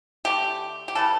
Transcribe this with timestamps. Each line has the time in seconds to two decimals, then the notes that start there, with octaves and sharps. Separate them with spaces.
0.25 D3 A3 G4
0.88 G4
0.95 C#3 E3 G3 A4